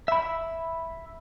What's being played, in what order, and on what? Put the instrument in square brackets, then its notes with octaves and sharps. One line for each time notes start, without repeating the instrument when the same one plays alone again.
[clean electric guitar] E5 B5